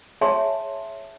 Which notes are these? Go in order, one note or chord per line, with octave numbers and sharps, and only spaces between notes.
G#4 C#5 E5 G#5 A5 C6